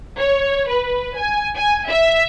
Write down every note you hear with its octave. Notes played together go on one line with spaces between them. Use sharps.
C#5
B4
G#5
G#5
E5